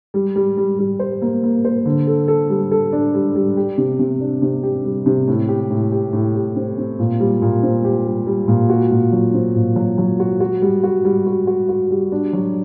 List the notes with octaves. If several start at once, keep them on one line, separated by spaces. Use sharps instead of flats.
G3
G3
G3
G3
C5
A#3
A#3
C5
D3
A4
A4
G3
A4
D4
G3
G3
G4
C3
C3
D4
C3
G4
G3
C3
A2
G4
A2
G4
A2
G4
C4
C4
A#2
G3
A#2
C4
G4
G3
G3
A#2
F#4
A#2
F#3
C4
A#2
F#3
F#3
F#4
F#4
G3
F#4
G3
F#4
F#4
F#4
G3
D4
F#3